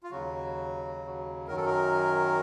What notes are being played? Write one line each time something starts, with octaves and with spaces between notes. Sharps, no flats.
F4
D#2 C#3 F#3 F#4
F#2 D#3 F#3 A#4
A4
A#4